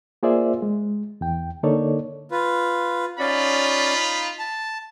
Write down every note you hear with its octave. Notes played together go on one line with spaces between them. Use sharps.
A#3 F4 G#4 C5 D5 E5
G#3
E2 G5
D3 A#3 D#4 A4 C#5 D5
F4 B4
C#4 D#4 F4 D5 B5
A5